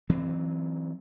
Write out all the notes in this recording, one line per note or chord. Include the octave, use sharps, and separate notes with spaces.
E3 F#3 C4